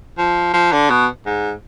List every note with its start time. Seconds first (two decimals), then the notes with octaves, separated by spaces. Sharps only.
0.18 F3
0.54 F3
0.72 D3
0.90 B2
1.26 G#2